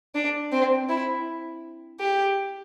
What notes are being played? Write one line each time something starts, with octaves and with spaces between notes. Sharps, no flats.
D4
C4
E4
G4